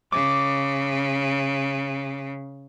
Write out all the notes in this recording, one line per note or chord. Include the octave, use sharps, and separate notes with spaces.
C#3 D6